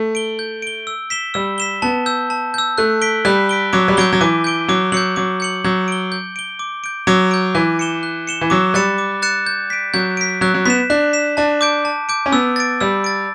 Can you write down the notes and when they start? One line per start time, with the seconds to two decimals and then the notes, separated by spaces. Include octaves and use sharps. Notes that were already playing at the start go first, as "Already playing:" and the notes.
Already playing: A3
0.15 D7 G7
0.39 G6
0.62 D7 G7
0.87 E6
1.10 B6 E7 G7
1.34 G3 E6
1.58 B6 E7 G7
1.82 B3 A5
2.06 E6 G6
2.30 A5
2.54 E6 G6
2.78 A3 F#6
3.02 B6 D7 G7
3.25 G3 F#6
3.49 B6 D7 G7
3.73 F#3 D6
3.88 G3
3.97 F#3 G6 D7 G7
4.12 F#3
4.21 E3 D6
4.44 G6 D7 G7
4.68 F#3 D6
4.92 F#3 G6 C#7 F#7
5.16 F#3 D6
5.40 G6 C#7 F#7
5.64 F#3 G6
5.88 D7 G7
6.12 G6
6.36 D7 G7
6.59 D6
6.84 G6 D7
7.07 F#3 D6
7.31 G6 D7
7.55 E3 F#6
7.79 C#7 E7 G7
8.03 F#6
8.27 C#7 E7 G7
8.41 E3
8.50 F#3 D6
8.74 G3 F#6 A6 C#7 E7
8.98 D6
9.22 F#6 A6 C#7 E7
9.46 G6
9.70 B6 D7
9.94 F#3 G6
10.17 B6 D7
10.41 F#3 F#6
10.54 F#3
10.65 B3 B6 E7
10.90 D4 F#6
11.13 B6 E7
11.37 D4 A5
11.61 D6 G6 D7
11.85 A5
12.09 D6 G6 D7
12.26 C#4
12.32 B3 E6
12.56 A6 D7
12.81 G3 E6
13.04 A6 D7